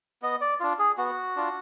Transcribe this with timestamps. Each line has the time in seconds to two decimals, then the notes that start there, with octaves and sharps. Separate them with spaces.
0.22 B3 D#5
0.41 D5
0.60 D4 F4
0.79 G#4
0.98 B3 F#4
1.36 D4 F4